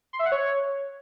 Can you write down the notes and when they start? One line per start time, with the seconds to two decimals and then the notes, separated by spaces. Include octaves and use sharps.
0.13 C6
0.19 E5
0.25 F#5
0.32 C#5